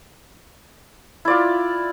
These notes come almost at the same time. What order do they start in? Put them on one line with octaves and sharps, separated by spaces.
E4 D5 F4